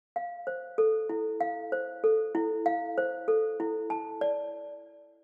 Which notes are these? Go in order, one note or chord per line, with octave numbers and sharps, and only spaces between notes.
F5
C5
A4
E4
F5
C5
A4
E4
F5
C5
A4
E4
A5
D5